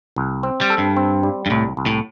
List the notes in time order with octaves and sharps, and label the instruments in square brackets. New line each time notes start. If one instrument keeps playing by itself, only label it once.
[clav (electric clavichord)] C2
C4
[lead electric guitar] G3
[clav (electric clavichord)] A4
[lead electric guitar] G2
[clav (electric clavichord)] C4
G3
[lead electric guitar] G2
[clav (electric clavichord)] C2 [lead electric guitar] A2
[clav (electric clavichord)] C2
[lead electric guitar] A2